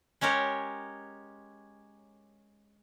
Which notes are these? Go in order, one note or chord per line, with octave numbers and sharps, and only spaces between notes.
G#3 C#4 G4 A#4 C#5